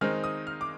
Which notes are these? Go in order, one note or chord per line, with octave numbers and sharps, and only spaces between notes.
D#3 G#3 C4 D#4 F6
D#6
F6
D6